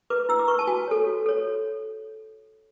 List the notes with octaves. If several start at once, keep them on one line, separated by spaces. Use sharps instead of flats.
B4 D6
E4 E6
D6
B4 C#6
A5
F#4 G#5
A4 C#5
F#4
A4 C#5